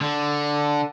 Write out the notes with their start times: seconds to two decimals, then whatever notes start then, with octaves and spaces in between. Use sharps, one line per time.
0.01 D3